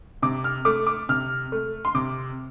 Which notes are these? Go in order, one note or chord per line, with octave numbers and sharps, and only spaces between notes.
C3 D6
F6
A3 D6
D6
C3 F6
A3
C6
C3 D6